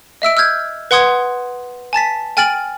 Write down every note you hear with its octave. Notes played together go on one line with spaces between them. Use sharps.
D#5 E5 E6 D7
E6 F6 G6 G#6
B4 F#5 C6 D#6 G#6
G#5 A5 A6 B6
G5 G#5 F6 A6 D7 F#7